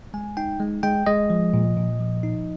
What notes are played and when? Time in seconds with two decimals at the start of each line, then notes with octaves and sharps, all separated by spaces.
0.14 G#3 G#5
0.37 D#4 G5
0.60 G#3
0.83 G#3 G5
1.06 G#3 D#5
1.30 F3
1.54 A#2
1.77 A#2
2.00 F3
2.23 D#4